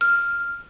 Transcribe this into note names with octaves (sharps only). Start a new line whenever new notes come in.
F6